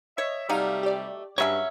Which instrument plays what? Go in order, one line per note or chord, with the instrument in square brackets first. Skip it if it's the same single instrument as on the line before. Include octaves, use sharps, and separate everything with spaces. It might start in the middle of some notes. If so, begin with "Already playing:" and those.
[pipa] C#5 [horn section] D#5 E5
[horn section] C3 G3 [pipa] F#3 A3 D#4 [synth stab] D5 F5 F6
[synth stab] G4 D5
[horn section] G2 [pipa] C#3 F#3 C#4 [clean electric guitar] C#5 E5